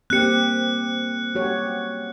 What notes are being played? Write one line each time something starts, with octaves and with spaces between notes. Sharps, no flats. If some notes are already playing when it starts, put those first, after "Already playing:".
A#3 C4 G4 F#6 C#7
F#4 G4 C#5